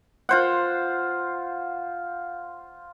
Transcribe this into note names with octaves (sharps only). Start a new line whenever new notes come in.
F4 C5 F#5